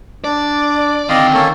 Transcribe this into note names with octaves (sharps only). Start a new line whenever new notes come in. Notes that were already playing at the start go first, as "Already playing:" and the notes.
D4 D5 D6
D3 D#3 C4 D5 D#5 F5
A#3 C#4 A4